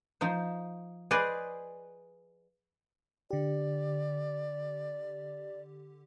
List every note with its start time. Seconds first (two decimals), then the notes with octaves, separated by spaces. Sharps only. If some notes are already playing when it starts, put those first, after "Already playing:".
0.21 F3 D#4 C5
1.11 G#4 B4 C5 D5 D#5 G#5
3.31 D3 G4 D5